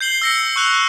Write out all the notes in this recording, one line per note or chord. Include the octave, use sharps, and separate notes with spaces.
G6 C7 F#7 G7
E6 A#6 C#7
C#6 E6 F#6 F7